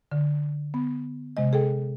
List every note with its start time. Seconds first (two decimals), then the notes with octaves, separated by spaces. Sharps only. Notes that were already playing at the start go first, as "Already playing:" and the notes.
0.12 D3
0.74 B3
1.37 C3 G#3 D#5
1.53 G#4 A4 G5